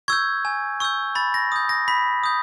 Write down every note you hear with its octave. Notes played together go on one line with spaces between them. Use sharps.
C#6 E6 G6 G#6
G#5
C#6 E6 G6
B5 A6
A#6
D#6 G6
A#6
B5 B6
D#6 G6